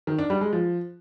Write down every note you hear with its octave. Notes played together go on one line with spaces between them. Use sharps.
D#3
D4
G3
G#3
F3